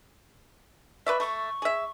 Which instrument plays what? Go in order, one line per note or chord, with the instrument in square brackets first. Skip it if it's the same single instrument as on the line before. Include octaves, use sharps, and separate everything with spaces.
[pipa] B4 D5 E5 [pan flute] C#6
[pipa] A3 [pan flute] C#6
[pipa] G#4 E5